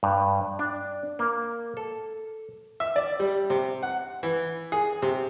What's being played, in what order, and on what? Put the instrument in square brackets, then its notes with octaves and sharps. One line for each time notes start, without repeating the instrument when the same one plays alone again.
[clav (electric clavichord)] G2
D4
A#3
A4
[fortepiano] E5
D5
G3
C3
F#5
E3
G#4
C3